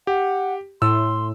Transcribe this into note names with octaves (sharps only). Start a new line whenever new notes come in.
G4 F#5
A2 C6 E6